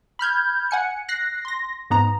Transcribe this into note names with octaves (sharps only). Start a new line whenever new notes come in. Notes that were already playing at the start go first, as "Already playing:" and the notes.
B5 F6 G6 G#6
F#5 G#5 C#7
F#6 A#6 C7
C6 A#6
G#2 B3 A#5